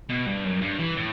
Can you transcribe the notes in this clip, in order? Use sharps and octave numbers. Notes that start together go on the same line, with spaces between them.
B2
G2
F#2
G2
E3
A2